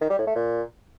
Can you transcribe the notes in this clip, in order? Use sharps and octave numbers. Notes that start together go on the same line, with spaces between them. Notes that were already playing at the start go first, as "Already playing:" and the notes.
D#3
G3
A2
A3
A#2